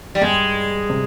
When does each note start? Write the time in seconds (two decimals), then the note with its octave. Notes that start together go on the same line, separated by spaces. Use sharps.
0.15 G3
0.21 G2 G#3
0.90 C3